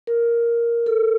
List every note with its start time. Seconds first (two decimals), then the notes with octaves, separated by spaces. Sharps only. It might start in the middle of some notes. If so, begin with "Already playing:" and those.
0.07 A#4
0.86 A4